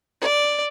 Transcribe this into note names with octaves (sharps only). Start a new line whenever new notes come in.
D5